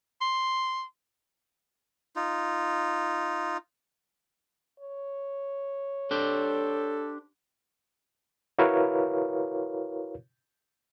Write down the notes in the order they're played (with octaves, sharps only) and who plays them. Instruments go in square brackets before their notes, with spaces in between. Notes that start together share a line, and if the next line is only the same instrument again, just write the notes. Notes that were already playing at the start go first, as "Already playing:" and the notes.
[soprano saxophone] C6
[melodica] D#4 F4
[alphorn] C#5
[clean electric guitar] D4 G4 C5 [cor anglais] A4
[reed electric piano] E4 F#4 A#4 B4 C#5 F5